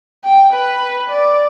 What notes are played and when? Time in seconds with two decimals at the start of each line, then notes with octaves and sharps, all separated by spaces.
0.24 G5
0.53 B4
1.10 D5